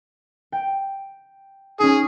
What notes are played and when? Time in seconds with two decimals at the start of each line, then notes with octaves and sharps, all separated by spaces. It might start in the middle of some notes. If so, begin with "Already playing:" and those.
0.52 G5
1.80 C#4 D#4 G#4